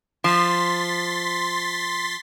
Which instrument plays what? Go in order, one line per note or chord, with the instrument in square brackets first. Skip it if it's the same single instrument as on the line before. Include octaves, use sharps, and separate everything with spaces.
[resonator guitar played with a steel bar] F3 [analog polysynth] C6 A6 B6